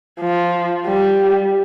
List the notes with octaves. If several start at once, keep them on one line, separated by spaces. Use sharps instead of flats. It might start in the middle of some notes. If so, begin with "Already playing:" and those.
F3
G3